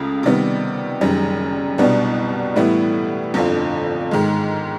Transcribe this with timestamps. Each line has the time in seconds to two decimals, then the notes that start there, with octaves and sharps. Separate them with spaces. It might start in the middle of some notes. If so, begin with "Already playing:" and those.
Already playing: C#2 C#3 A3
0.23 C3 D#3 G3 B3
1.01 F#1 F#2 D#3 G3
1.78 C2 B2 G3 B3 D4
2.56 A2 E3 G3 B3 E4
3.34 G1 F2 D3 F3
4.11 G#2 D#3 G#3